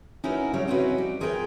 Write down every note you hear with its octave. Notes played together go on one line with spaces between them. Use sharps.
C#4 D#4 E4 F#4 A#4 B4
C#3 F#3 G3 C#5
C4 C#4 D#4 E4 F#4 B4
G3
F4 G#4 A#4 B4 D5 G5